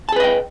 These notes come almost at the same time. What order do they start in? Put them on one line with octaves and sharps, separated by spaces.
A5 G#4 B4 D#5 G5